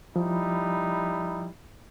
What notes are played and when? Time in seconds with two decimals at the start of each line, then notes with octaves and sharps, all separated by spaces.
0.16 F3 G3 D#4 E4